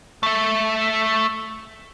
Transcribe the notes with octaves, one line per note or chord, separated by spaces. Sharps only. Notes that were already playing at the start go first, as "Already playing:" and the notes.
A3 E5